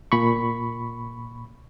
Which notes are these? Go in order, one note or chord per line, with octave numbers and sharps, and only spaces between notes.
A#2 B5 C#6